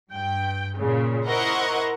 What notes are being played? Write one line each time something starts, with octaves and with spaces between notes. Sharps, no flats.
G2 G5
A#2 C#3
E4 A#4 C5 D#5 F#5 C#6